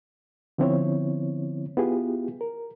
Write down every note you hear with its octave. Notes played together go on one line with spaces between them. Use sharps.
D3 F3 B3 C4 E4 C#5
B3 E4 F4 G4 G#4
A#4